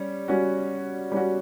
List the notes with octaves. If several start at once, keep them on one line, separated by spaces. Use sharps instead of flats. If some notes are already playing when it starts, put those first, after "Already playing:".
Already playing: G3 C#4
G3 C#4 F#4
G3 C#4 F#4